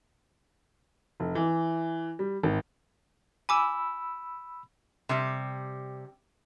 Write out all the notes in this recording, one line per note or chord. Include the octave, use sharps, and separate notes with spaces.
F1
E3
G3
G#1
G#5 B5 D6 E6
C3 G3 G4